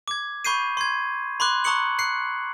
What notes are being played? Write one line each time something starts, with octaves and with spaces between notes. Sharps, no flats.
D6 G#6
B5 C#6 G6 C7 D#7
C6 G#6
B5 C6 D6 F#6
A#5 C#6 D#6 F#6 C#7 F#7
F#6 C7 C#7